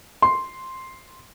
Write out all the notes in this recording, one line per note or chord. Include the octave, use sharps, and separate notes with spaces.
C6